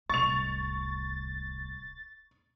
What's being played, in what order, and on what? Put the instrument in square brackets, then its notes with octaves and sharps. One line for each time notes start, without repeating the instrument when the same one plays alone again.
[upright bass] D1 C2 [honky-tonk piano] C#6 F7 [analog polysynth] A6